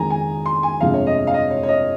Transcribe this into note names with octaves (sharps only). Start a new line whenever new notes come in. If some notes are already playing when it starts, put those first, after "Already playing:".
Already playing: F2 D#3 G#3 G#5 A#5
G#5
C6
G#5
G1 F2 C3 F3 G#3 F5
C#5
D#5
F5
D#5
C#5
C#5
D#5